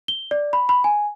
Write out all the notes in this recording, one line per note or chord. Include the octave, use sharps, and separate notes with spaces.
G7
D5
B5
B5
G#5